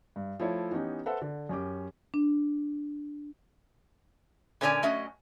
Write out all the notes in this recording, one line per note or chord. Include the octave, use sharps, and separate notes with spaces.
G2
F3 A3 E4 C#5
E3 B3 C#4 D#4 G4
A4 B4 C5 E5 F#5
D3
F#2 C#4 G4 D6
D4
A#2 D3 C#4 C#5 D5 G#5
F#3 A3 C#4 D#5